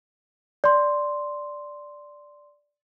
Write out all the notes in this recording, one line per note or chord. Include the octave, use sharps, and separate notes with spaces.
D5 C6